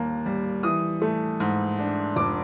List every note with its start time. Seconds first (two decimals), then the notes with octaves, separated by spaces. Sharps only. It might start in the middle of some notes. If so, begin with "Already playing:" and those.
Already playing: D#2 G3 A#3
0.26 G3
0.63 E3 D#6
1.02 A3
1.40 G#2
1.79 D4
2.16 F1 D6